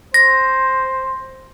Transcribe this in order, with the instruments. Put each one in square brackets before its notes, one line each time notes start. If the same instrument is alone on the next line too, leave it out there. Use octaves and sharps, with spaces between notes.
[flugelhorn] C5 [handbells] A#6